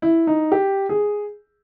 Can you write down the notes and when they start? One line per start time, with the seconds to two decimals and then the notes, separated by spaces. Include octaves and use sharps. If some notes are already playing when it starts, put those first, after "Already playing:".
0.02 E4
0.27 D#4
0.52 G4
0.89 G#4